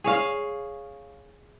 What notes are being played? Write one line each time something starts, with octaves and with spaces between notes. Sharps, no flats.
G#4 C#5 F5